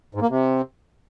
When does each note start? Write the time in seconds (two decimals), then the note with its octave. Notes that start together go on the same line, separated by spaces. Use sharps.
0.15 G#2
0.22 A#3
0.30 C3